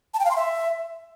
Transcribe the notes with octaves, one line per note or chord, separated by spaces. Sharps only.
A5
G5
F5
C6
E5